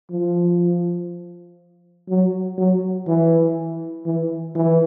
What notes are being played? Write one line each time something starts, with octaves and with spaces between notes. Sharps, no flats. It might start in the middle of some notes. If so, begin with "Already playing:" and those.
F3
F#3
F#3
E3
E3
E3